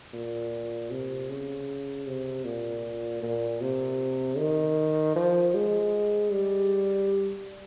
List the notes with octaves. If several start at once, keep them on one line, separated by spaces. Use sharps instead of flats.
A#2
C3
C#3
C3
A#2
A#2
C3
D#3
F3
G#3
G3